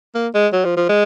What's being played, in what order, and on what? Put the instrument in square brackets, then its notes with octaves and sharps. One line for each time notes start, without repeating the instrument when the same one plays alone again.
[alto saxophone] A#3
G#3
F#3
F3
F3
G#3